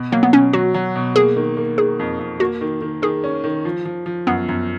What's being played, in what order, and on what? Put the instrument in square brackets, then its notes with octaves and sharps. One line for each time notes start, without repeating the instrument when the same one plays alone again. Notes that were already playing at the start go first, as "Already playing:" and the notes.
Already playing: [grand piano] B2
[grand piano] F#3 [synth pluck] A#3
[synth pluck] B3
[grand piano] B2 [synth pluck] C#4
[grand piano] F#3 [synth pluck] F#4
[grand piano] F#3
B2
[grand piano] A#3 [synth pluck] G#4
[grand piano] D#3
A#3
[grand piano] D#3 [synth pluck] G#4
[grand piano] F2
F2
[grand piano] A#3 [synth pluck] F#4
[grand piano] D#3
D#3
[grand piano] D#3 [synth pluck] G#4
[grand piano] C#4
D#3
F3
F3
F3
[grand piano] F#2 [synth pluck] B3
[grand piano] F#2